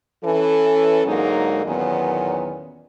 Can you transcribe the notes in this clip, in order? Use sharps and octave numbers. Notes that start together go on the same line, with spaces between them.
E3 C#4 A4
G#2 D3 F#3 G#3 A#3 D#4
E2 A#2 D#3 F#3 B3 C#4